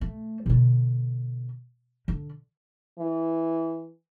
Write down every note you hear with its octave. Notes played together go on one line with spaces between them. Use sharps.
A3
B2 D3
D3
E3